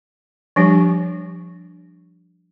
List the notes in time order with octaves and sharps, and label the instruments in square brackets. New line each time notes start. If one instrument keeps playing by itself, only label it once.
[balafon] F3 G3 D4 G4